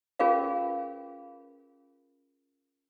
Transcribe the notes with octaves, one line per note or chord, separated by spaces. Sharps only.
C#4 F4 G#4 A#4 B4 F5